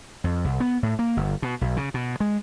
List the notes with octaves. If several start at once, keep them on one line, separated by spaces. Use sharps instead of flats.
F2
C2
B3
A2
A#3
G1
B2
B1
C#3
B2
G#3